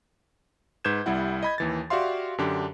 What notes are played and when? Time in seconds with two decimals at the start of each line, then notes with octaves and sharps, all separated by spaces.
0.84 G#2 B4 G6 G#6 E7
1.06 C2 G3 E4 F#5
1.43 D#5 B5 G#6
1.58 D#2 E3 A6
1.90 F#4 G4 D5 E5 F5 C6
2.38 F#2 D3 D4 G4